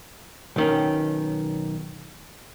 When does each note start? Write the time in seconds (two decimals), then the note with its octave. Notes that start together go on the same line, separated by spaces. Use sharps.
0.56 B1 D#3 C#4